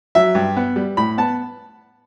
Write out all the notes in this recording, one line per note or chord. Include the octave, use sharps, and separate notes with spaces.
F#3 E5
G2
B3
G3
A2 B5
B3 A5